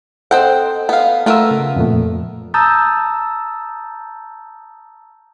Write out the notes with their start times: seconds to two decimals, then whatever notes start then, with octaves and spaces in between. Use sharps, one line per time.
0.31 C4 A4 C5 D#5 F#5 G5
0.89 B3 F5
1.26 A3 B3 F4 A#4 E6
1.51 C#3
1.76 F2 A#2 A3
2.54 A5 A#5 D#6 E6 G6 A6